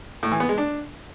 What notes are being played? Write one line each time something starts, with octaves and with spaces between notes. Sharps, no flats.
A2
E3
B3
G#3
D4